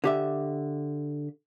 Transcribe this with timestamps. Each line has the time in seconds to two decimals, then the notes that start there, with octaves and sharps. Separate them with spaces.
0.04 D3 G4 E5